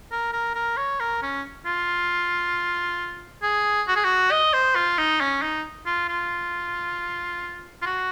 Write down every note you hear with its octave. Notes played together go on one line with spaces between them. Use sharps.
A#4
A#4
A#4
C#5
A#4
C#4
F4
G#4
F#4
G#4
F#4
D#5
C5
F4
D#4
C#4
D#4
F4
F4
F4
F#4